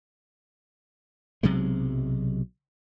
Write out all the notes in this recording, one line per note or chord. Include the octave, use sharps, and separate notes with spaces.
B1 C3 F#3 G#3